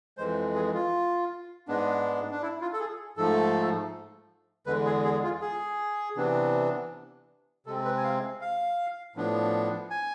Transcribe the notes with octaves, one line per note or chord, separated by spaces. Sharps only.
F2 E3 G#3 C5
G#4
F4
G#2 G#3 B3 D4
D4
E4
F4
A4
G#4
G#2 F3 A3 A4
E2 D3 G#3 B4
G#4
G#4
F4
G#4
C3 E3 B3 D4
C3 G#3 C4 A4
B4
G#5
F5
F5
A2 F3 B3 D4
G#5